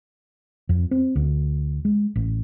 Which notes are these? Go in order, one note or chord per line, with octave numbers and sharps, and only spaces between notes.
F2
C4
D2
G#3
A1